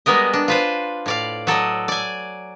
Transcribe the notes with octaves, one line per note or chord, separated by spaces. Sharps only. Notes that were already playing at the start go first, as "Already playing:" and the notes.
G3 G#3 B3 A#4 D#5
D4
F4 B4 C5
A2 D5 F5
F#3 A4 D5 D#5
D5 G#5